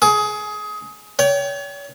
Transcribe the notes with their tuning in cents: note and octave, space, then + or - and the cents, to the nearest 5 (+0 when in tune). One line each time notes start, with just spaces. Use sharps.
G#4 +20 D6 -45
C#5 +35 G5 -10